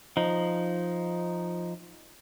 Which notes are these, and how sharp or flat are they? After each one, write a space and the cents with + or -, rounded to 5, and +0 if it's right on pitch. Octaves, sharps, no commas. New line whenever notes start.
F3 +0 D#4 +0